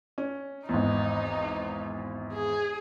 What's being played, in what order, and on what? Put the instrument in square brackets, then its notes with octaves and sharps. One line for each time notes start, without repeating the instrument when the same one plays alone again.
[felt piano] C#4
[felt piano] G#1 E2 [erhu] D#4
[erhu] G#4